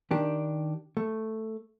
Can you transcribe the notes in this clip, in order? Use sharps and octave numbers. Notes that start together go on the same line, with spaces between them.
D#3 D4 G4
A3